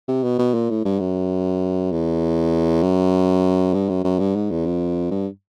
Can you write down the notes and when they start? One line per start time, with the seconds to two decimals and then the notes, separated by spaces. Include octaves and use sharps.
0.08 C3
0.24 B2
0.39 B2
0.54 A#2
0.70 A2
0.85 G2
1.00 F#2
1.92 E2
2.83 F#2
3.74 G2
3.89 F#2
4.04 F#2
4.20 G2
4.36 G#2
4.50 E2
4.66 F2
5.11 G2